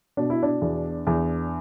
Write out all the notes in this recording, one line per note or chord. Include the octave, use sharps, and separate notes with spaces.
B2 D4
E4
D4
E2
E2